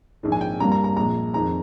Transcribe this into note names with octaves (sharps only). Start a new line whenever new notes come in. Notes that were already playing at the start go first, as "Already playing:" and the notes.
A#1 G#2 D#3 G#3
G#5
G5
G2 G3 A#3 A#5
A#5
A#5
A#1 A#2 G#3 A#5
F2 D#3 G#3 A#5